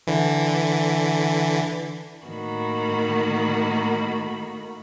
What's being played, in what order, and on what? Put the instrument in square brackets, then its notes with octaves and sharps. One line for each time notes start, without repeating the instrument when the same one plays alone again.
[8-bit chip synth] D3 E3
[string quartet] A2 D#3 A#3 F#4 B5